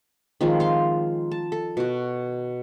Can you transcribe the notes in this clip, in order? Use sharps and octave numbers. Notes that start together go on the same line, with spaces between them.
D#3 F3 G#3 C4
C5 F5 C6
A5
A4
B2 F#4